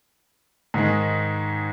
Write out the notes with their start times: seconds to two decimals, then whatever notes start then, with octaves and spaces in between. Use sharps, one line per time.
0.74 G#2 D#3 G#3